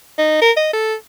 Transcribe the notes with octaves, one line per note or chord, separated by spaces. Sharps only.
D#4
A#4
D#5
A4